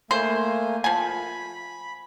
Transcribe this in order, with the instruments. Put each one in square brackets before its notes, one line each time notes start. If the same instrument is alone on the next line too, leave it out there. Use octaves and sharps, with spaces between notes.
[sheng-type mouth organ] A3 A#3 G#5 [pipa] C5
[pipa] F3 G#5 [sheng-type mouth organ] B5